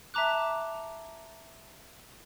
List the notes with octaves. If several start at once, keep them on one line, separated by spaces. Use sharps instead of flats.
E5 A5 A#5 D6 F#6